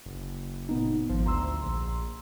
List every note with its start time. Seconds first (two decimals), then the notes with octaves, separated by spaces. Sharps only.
0.06 F#1
0.69 A#2 B3 D#4
1.09 G#1 F3
1.26 D2 A#5 C6 E6
1.62 A#1